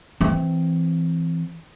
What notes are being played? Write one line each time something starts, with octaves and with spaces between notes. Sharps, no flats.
E3 C4